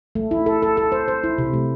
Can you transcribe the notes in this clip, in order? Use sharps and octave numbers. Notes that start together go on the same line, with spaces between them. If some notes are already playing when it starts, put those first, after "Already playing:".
A3
E4
A4
A4
A4
C5
C5
E4
C3
A3